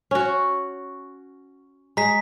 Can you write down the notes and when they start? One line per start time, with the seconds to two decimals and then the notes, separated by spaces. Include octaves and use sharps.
0.11 C#4 F#4
1.97 G#3 A#5 B6